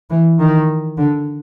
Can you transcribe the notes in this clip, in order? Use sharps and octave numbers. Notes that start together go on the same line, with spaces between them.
E3
D#3
D3